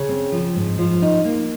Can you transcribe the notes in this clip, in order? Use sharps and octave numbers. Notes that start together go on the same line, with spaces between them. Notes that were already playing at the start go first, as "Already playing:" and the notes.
Already playing: C#3
C4
F3
G#2
F3
D#4
A#3